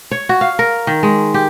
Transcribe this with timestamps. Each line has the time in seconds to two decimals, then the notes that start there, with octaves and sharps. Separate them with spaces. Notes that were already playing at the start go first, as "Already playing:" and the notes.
0.11 C#5
0.29 F#4
0.41 F5
0.59 A#4
0.87 D#3
1.03 G#3
1.34 G4